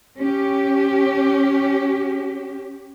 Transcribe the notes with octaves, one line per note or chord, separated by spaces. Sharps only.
C#4 G4